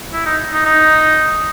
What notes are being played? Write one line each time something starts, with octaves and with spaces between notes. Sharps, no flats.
E4
D#4
D#4
D#4